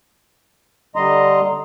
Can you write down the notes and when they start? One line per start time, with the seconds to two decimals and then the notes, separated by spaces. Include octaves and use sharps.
0.96 D3 G3 D#5 A#5 C6